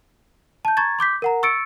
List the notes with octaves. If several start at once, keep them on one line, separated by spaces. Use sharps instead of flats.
A5 G6
A#5 C#6 G#6 A6
C6 D6 G6 B6
A#4 F#5 A#5
C#6 E6 A6 C#7 D7